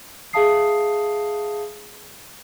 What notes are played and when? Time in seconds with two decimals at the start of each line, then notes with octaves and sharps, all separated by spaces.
0.33 G#4 E5 F5 A5 D#6 C7